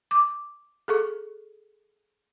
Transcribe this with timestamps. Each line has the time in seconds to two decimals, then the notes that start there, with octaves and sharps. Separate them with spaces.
0.11 D6
0.88 G#4 A4 C#6